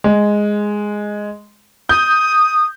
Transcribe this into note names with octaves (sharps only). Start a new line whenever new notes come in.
G#3
D#6 G6